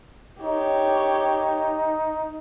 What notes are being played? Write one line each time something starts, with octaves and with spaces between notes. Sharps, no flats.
D#4 G4 C#5